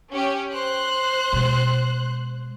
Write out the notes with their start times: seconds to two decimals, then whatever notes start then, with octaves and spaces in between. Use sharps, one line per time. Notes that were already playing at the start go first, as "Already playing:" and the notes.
0.13 C#4 G4
0.52 C5 F#6
1.33 B2 G#3